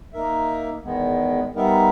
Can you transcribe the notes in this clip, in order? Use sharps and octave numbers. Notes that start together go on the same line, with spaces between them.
A#3 D#4 A#4 E5
E2 D#3 G#3 B3
G3 B3 D#4 A#4 E5